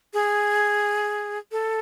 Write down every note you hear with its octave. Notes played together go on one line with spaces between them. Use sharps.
G#4
A4